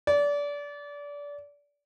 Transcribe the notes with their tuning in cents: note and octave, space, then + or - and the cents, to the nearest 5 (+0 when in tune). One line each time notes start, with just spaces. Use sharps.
D5 -25